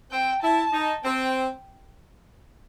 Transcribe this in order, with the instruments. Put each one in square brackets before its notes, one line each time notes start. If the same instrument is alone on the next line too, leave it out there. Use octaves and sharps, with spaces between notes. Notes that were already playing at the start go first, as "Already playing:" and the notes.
[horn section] C4 [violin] G5
[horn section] E4 [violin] A5
[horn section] D#4
[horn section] C4 [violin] G5